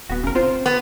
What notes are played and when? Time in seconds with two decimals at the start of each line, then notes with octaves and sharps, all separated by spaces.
0.09 D#1 B3 F#4
0.23 F1 C#3 A#4
0.35 C4 F4 C5
0.66 B3